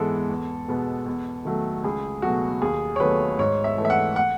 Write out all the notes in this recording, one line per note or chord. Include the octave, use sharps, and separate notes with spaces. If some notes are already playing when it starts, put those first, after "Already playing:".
Already playing: G#2 E3 G#3 B3 A4
E2
B2 G#3 B3
E2
D#3 F#3 A3
C#2 G#4
B2 F#3 A3 F#4
D#2 G#4
C#5
D#3 F#3 A3 B4
G#2 C#5
E5
E3 A3
E5
F#5
F#5